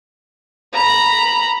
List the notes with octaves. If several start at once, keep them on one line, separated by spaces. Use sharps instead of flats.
A#5 B5